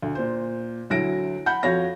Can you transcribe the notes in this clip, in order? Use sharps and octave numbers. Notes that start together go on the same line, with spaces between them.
D2
A#2 C5
D2 F#3 E4 A#6 D7
F#5 B5 G6
F2 F#4 C#5 F5 A#6